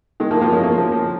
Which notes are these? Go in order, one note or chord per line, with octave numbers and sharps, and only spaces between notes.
D#3 G#3
F3 A#3
F3 A#3
G#3 C#4
F3 A#3
F3
F3